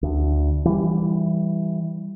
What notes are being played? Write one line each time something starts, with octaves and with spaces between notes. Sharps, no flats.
D2
E3 G3